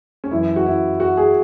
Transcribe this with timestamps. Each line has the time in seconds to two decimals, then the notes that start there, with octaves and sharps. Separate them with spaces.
0.24 C#4
0.31 F#2 E3 E4
0.56 F#4
0.66 E4
1.00 F#4
1.17 G#4